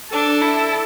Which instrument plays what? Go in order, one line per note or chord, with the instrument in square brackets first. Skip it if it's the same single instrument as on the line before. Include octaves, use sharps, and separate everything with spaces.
[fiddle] D4 [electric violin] A4
[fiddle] E4